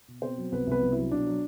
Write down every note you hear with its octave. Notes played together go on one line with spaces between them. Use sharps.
B2
B2 C4 C5
F#3
C2 B3 B4
C2 B3 B4
C2
F#3 E4
B2 D4
F#3